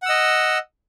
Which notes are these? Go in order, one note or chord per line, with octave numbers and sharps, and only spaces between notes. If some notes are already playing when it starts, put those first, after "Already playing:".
D#5 F#5 E6